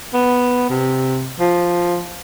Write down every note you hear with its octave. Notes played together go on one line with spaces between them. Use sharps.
B3
C3
F3